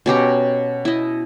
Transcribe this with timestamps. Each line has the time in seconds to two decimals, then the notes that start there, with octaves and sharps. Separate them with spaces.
0.06 B2 C#4 G4 A#5
0.85 E4 D#5